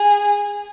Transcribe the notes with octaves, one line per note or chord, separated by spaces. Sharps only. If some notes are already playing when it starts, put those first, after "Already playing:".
Already playing: G#4